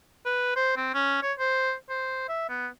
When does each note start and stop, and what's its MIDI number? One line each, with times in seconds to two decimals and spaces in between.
0.25 0.52 71
0.56 0.76 72
0.77 0.92 60
0.94 1.18 61
1.23 1.33 73
1.39 1.74 72
1.89 2.24 72
2.29 2.46 76
2.49 2.67 59